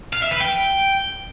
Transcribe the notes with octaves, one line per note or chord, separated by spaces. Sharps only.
F5
E5
B4
G5